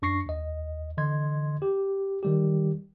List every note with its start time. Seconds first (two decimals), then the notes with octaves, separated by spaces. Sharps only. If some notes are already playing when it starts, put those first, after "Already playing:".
0.02 F#2 D4 C#6 A#6 C7 C#7
0.26 D#2 D#5
0.97 D3 E3 D#5 C6 G#6
1.62 G4
2.23 D#3 G3 G4